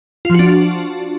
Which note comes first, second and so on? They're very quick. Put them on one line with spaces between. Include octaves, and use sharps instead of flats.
F4 F3 F#4 D4